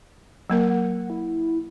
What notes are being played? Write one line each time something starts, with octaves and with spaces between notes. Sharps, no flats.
F#3 A#3 A#4 F#5
F#5
E4